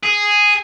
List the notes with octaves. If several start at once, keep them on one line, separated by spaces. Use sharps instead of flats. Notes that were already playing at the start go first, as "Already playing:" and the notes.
G#4